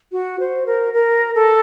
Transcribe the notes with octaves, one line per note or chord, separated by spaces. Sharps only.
F#4
C5
A#4
A#4
A4